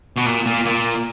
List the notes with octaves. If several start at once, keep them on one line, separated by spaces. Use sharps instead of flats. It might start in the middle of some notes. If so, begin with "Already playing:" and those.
B2
A#2
A#2
A#2